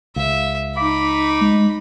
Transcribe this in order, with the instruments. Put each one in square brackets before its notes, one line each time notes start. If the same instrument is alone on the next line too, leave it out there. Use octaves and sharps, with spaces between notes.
[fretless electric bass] C#2 [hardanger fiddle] E5 [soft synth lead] F5
[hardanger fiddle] D#4 B5 [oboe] D6 [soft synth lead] B6
[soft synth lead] G#3